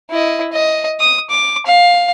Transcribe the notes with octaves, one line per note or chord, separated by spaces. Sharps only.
E4 D#5
D#5
D#6
D6
F5